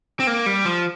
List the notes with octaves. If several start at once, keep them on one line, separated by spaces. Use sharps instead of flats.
C4
A#3
G3
F3